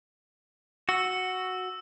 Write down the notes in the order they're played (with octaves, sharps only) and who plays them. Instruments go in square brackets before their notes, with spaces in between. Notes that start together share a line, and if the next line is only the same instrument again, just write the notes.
[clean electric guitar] F#4 [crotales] E6